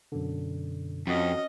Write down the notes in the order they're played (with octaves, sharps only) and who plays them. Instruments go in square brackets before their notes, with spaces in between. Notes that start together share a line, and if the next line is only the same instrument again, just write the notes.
[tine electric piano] F#2 B2 D3
[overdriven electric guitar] F2 [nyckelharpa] C#4 D#5 [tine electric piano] F#4 F#5